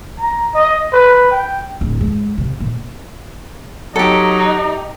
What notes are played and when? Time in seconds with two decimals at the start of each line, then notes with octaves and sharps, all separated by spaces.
0.19 A#5
0.54 D#5
0.93 B4
1.31 G5
1.81 D1
2.01 G#3
2.38 C3
2.60 A#2
3.96 F#3 D#4 G4 A4